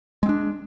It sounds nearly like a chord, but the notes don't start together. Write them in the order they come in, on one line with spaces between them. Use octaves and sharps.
G#3 C4 D4